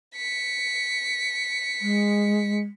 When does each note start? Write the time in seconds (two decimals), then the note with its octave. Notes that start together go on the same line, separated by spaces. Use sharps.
0.15 B6 C#7
1.82 G#3